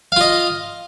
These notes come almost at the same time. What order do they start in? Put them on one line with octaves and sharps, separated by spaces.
F5 F4 D#5